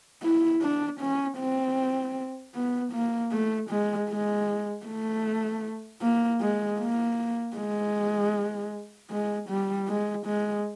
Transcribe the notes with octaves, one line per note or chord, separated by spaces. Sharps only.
E4
D4
C#4
C4
B3
A#3
A3
G#3
G#3
A3
A#3
G#3
A#3
G#3
G#3
G3
G#3
G#3